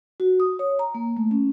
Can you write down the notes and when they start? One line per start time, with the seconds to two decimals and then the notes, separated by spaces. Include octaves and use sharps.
0.20 F#4
0.40 D#6
0.59 C#5
0.79 A#5
0.95 A#3
1.17 A3
1.31 C#4